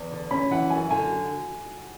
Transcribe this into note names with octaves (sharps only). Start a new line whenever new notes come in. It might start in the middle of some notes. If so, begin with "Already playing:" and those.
Already playing: E2
D3
C#4 B5
E3 F#5
F#2 G#5
D3 G#5